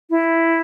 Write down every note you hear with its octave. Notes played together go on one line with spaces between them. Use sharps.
E4